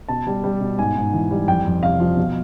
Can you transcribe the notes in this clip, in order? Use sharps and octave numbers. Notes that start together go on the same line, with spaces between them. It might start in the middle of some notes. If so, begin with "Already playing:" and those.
B2 A5
G3
G3
B2
G#2 G#5
G#2
E3
G3
F2 G5
F2
C3 F5
F3
B2